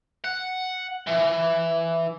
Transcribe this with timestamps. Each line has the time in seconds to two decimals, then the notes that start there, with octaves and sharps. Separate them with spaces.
0.24 F#5
1.07 E3